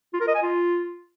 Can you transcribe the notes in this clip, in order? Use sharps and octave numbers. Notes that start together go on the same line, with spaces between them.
F4
A#4
D#5
G#5
F4